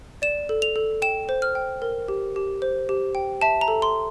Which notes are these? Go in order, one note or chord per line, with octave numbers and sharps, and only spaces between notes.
D5 E7
A4
F7
A4
G5 E7
C5
F6
G5
A#4
G4
G4
C5
G4
G5
E5 A5
A#5
A4
C6